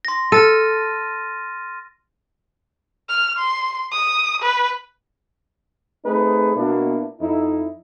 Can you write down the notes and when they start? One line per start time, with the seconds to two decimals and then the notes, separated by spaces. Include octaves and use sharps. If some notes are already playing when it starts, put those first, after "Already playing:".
0.05 C6 A#6
0.32 A4 F6 A6 D#7
3.08 F6
3.38 C6
3.92 D#6
4.42 B4
6.05 A3 C4 D#4 G#4 B4
6.56 B2 A#3 B3 D4 E4 F#4
7.21 F2 D#4 E4